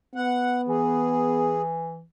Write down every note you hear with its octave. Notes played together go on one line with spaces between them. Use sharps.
B3 F#5
E3 G#4